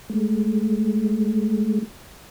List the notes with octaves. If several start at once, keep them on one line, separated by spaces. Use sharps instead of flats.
G#3 A3